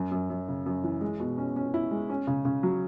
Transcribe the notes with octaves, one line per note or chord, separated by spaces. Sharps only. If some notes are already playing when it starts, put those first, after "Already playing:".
Already playing: F#2
F#2
F#2
C#3
F#2
E3
G#3
B2
C#4
C#4
E4
G#3
C#4
C#3
C#3
F#3